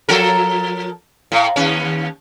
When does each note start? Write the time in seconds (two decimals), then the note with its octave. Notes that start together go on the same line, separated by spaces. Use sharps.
0.09 F3 A4 A#4
1.32 A2
1.56 D#2 C#4